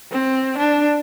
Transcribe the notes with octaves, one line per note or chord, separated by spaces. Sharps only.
C4
D4